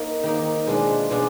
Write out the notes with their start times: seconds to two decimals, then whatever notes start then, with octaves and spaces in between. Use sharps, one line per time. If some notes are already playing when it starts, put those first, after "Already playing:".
Already playing: A#3 D#4
0.23 D#3 A#3 D#4
0.67 B2 G#3 D4 F4
1.10 B2 G#3 D4 F4